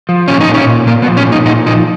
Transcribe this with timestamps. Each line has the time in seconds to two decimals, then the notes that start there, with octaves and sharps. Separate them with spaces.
0.09 F3
0.28 A#2 C#4
0.41 D#4
0.48 A#2
0.54 C#4
0.67 A#2
0.87 A#2 A#3
1.02 B3
1.08 F3
1.17 C#4
1.27 A#2
1.32 D#4
1.46 A#2 D#4
1.66 F3 D#4